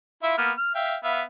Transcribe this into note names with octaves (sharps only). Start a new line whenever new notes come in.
E4 F4 E5
A#3 B3 F6
F6
E5 F5 G5
B3 E5 F5